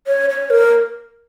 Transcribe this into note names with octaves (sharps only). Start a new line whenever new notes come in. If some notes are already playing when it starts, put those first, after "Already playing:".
C#5
C#5
A#4